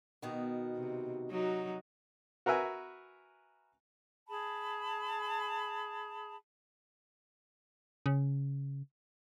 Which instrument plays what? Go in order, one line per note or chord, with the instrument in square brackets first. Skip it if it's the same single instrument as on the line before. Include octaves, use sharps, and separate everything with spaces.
[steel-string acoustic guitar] B2 D#3 F#4
[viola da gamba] C3
F#3 D#4 F#4
[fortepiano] F#4 A#4 B4 E5 G#5
[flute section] G#4 A5 B5
[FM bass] C#3